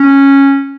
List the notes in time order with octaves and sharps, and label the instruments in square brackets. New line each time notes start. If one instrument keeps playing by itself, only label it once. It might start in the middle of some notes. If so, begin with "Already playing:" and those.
Already playing: [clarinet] C#4